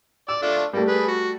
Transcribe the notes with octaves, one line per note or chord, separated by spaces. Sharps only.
D5 E6
A3 D4 F4
G3 A3 A#3
G#4 B4
F#4